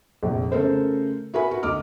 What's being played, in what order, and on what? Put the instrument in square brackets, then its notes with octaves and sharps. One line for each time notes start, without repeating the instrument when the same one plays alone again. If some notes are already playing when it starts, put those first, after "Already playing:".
[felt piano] F1 A#1
C#3 A3 A4 A#4 C5
E4 F#4 A#4 B4 G#5 B5
F#4
D2 D#5 D6 F6